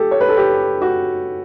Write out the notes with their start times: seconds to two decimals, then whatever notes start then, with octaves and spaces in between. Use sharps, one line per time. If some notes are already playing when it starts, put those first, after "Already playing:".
Already playing: G4 A4
0.11 C#5
0.21 B4
0.29 A4
0.37 G4
0.82 F#4